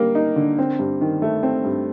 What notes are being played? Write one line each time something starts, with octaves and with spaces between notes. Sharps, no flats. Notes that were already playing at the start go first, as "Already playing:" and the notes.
Already playing: D3 G3 A#3
D#4
D3
C4
G2
D#3
A3
C4
G2